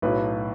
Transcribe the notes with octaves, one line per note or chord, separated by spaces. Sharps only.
B1 A2 F#3 B4